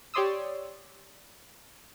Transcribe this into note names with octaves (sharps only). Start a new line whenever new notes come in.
G4 C#5 D5 C6 D#6 E6